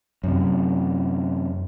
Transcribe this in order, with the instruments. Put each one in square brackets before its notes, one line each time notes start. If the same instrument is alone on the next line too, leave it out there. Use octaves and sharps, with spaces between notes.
[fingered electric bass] F#2 C3